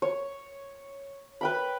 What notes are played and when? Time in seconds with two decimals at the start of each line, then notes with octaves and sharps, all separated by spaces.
0.02 C#5
1.41 B4 G5 B5